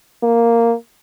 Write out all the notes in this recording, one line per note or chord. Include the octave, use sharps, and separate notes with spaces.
A#3